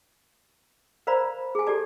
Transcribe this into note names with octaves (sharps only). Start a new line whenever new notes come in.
A#4 C5 D5 F5 A#5 B5
G#4 G#5
G4 A4 D5 A5